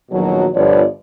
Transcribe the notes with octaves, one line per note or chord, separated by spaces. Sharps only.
A#1 B2 D#3 F#3
G1 F3 B3 C#5 D5